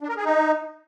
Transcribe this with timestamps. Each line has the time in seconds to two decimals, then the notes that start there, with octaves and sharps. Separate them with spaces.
0.01 D4
0.09 A#4
0.17 G#4
0.25 D#4